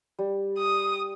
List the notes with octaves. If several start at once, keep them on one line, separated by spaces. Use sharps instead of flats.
G3
D#6